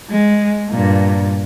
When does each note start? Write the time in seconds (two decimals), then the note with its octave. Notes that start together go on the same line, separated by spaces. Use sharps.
0.10 G#3
0.69 G2 A#2